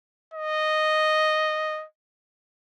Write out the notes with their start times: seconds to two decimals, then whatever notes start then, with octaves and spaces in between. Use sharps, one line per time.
0.34 D#5